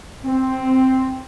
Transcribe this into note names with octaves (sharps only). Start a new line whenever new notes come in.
C4